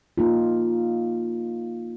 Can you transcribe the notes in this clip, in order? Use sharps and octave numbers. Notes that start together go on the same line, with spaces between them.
A#3 D#4 F4